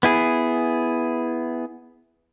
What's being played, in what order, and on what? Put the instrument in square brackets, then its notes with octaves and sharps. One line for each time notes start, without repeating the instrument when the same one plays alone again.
[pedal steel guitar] B3 E4 G#4